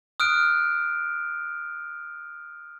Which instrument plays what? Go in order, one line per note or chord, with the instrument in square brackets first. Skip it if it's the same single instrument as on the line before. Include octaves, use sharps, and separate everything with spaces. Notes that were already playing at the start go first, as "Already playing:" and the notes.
[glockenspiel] D#6 F6 F#6 D7